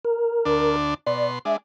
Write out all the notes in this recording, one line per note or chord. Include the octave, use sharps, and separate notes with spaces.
A#4
D2 D4
B2 D5 C6
G#3 D4 E5